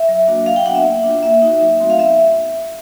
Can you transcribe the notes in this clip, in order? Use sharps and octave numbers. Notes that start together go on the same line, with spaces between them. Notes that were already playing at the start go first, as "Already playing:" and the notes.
Already playing: E5
F#3
A#3 D4 F#4
F#3 F5
G5
B3 D4 F#4 F#5
E5
A#3
D4 F4
A#3 E5
D#4 F#4
F#3
A3 C4 D#4 F#4
F5
B3 E5